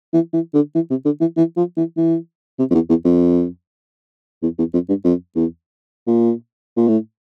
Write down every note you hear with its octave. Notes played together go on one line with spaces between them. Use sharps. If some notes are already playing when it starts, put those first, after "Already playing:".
E3
E3
D3
E3
C3
D3
E3
E3
F3
E3
E3
C3
F2
E2
E2
F2
E2
E2
F2
G2
F2
E2
A#2
A#2
A2